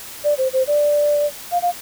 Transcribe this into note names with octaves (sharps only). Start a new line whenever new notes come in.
D5
C5
C5
D5
F5
F5